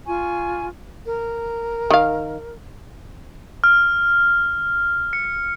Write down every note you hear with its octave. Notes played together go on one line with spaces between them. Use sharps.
F4 G#5 C#6
A#4
D#3 F5
F6
C#7